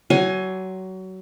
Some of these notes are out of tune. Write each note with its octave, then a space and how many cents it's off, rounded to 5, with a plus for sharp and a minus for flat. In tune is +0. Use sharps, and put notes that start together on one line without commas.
F#3 +25 G#5 +10 C6 +35